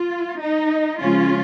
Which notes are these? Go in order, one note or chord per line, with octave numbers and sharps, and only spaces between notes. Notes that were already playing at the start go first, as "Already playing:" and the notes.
Already playing: F4
D#4
C#3 F3 G#3 C#4 F4